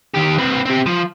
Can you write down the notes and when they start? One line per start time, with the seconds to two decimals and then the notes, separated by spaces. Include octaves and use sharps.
0.15 D#3 G4
0.38 C4 B4
0.65 C4 G4
0.86 F3